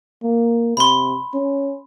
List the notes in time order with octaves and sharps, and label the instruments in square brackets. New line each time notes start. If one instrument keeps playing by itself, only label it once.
[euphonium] A#3
[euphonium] C3 [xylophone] B5 C6
[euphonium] C#4